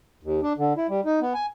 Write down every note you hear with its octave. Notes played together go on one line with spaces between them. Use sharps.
D#2
D4
D3
E4
G3
D#4
B3
G#5